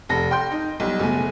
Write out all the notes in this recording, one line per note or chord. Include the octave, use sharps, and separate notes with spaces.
F1 A4 A#6
G5 C6 G6
D#4
B1 G3
F#1 B2 A3 G#5